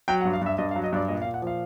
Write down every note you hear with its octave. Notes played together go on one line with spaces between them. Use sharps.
F#3 G5
F#5
G2
F5
G2 E5
G2 D#5
F5
F#3
D#5
G2 D5
A#2 D#5
F5
A#2
F#5
F3 F5